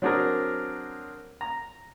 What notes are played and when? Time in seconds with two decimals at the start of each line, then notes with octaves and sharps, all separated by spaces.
0.02 F#3 C4 D4 G#4 A#4
1.41 A#5